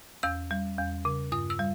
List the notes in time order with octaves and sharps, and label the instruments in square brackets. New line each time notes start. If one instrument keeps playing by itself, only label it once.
[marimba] E2 E6
G3
E2
C#3
G2 D#6
E6
G3